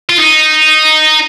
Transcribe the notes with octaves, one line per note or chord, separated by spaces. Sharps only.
F4
D#4